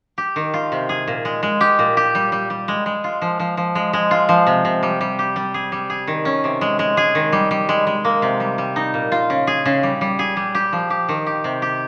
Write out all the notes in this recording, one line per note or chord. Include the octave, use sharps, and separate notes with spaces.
G4
D#3
F4
C3
G#4
A#2
G#3
G#3
G4
A#2
G4
G3
G3
G3
G#3
G#3
F4
F3
F3
F3
G#3
G#3
F4
F3
C3
C3
G3
G3
G4
G3
G#4
G3
G#4
D#3
C#4
C3
G#3
G#3
G#4
D#3
G3
G3
G#3
G#3
A#3
C3
G3
G3
D#4
A#2
F4
C#3
G#4
C#3
G3
G3
G#4
G3
G4
F3
G4
D#3
G4
C3
G4